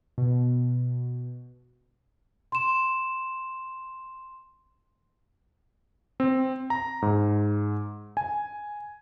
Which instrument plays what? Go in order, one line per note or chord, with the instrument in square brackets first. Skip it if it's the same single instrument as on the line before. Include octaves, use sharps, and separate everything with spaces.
[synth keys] B2
[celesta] C6 E7
[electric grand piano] C4
A#5
G#2
G#5